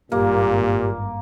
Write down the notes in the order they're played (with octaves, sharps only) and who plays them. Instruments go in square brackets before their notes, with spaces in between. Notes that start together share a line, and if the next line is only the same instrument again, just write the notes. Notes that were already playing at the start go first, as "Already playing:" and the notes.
[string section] G#1 G2 [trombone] A#2 [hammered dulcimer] A#3 [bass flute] G4